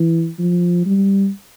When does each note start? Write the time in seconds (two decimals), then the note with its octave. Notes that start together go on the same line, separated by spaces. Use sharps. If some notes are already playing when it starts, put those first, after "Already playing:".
Already playing: E3
0.39 F3
0.86 G3